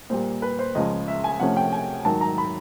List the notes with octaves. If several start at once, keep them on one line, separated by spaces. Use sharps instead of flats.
A#2 G3 A#3 C5
B4
C5
C#2 C#3 F3 G#3 D#5
E5
G#5
C3 F3 A3 C#4 F#5
G5
G#5
G#2 D#3 F#3 A5
A#5
B5